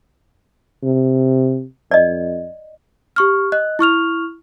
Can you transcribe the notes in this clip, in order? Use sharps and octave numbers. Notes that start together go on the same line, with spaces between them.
C3
F2 D5 D#5
G4 C#6 F6
D#5 F#6
E4 C#6 F6 F7